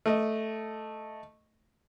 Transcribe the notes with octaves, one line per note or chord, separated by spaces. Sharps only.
A3 D#5